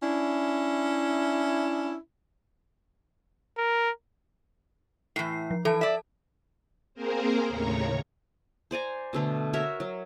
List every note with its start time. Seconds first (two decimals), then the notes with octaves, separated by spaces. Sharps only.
0.03 C#4 D4 E4
3.58 A#4
5.16 A2 E3 C7
5.51 F3
5.65 E3 A4 A5
5.81 D5 E5
6.94 A#3 C4 G#4 A#4 C5
7.48 D#2 A2 C#3 C#5 A#5 C#6
8.71 C5 D5 G#5 A#5
9.13 B2 D3 A3
9.53 F#4 A#4 C#5 E5
9.80 F#3